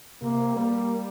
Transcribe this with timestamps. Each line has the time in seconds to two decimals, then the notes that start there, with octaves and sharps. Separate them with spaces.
0.22 C3 A#3
0.56 G3 A#3